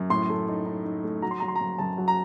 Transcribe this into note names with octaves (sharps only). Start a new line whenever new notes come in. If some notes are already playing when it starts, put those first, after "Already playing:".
Already playing: F#2
A2 C6
A3
D#4
D#4
D#4
A3
F#3 A#5
C6
F#3 A#5
C6
A#5
F#2
F#2 A5
F#3
A#5